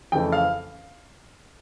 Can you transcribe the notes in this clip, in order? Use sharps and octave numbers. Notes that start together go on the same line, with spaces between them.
F2 C#3 E3 A3 G5
F5